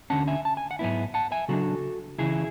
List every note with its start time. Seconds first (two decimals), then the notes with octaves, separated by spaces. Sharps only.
0.10 D2 D3 G#3 C#4 F#5 A5
0.28 E5 G#5
0.45 A5
0.57 G#5
0.71 F#5
0.79 G#2 F#3 B3 E4 E5 G#5
1.14 F#5 A5
1.32 E5 G#5
1.48 C#3 F#3 B3 D4 F#4 A4
2.18 C#2 C#3 E3 E4 G#4